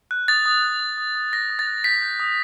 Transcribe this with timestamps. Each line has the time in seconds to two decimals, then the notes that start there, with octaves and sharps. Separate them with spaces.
0.11 F#6
0.28 D#6 A6
0.46 D#6
0.63 F#6
0.80 D#6
0.98 D#6
1.15 D#6
1.33 F#6 A#6
1.50 D#6
1.59 A6
1.67 F#6
1.84 G6 B6
2.02 G6
2.20 D#6